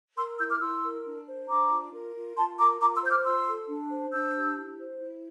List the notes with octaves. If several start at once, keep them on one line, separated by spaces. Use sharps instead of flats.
A#4 C6 E6
E4 E6 G6
D6 F6
E4 C6 E6
A#4
D4
C5
D4 A#5 D6
F4
A#4
F4
F4 A5 C6
A#4 A#5 D6
F4 A#5 D6
C6 E6
C5 G6
D6 F6
F4 C6 E6
A4
D4
C5
D4 E6 G6
G4
E4
C5
E4